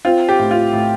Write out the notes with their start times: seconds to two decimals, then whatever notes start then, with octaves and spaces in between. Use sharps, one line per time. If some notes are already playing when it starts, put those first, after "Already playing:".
0.05 C4 F4
0.29 G4
0.39 A2
0.51 F4
0.73 A2